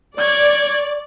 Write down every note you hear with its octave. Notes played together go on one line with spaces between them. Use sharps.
C#5 D5 G#6